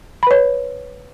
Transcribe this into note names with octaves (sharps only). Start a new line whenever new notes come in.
B4 C#5 B5